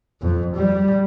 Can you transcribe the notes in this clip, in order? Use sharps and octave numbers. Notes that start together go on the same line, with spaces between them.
F2
G3